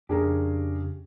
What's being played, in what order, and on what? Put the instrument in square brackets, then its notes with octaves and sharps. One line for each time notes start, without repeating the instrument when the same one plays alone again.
[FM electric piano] F2 [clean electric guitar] C#3 G4 [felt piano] D4 G#4 A#4